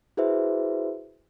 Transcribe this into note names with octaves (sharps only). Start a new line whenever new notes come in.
E4 F#4 G#4 B4 C5 E5